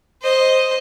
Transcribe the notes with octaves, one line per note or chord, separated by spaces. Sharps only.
C5 D#5